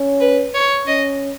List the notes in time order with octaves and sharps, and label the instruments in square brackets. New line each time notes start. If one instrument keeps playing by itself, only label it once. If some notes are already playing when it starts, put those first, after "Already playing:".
Already playing: [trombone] C#4
[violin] B4
C#5
[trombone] C#4 [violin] D#5